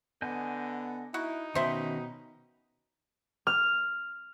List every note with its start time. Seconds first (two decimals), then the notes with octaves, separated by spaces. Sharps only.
0.22 D3 B3 D#5 G#5 G6
1.14 D#4 E4 F#4
1.55 B2 D#3 C#4 C5 E5 G5 B5
3.47 F6